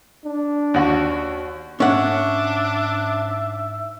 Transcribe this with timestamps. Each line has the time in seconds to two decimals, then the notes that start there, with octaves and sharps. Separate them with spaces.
0.25 D4
0.74 D#2 F#4
1.80 G#2 C#4 D4 E5 F#5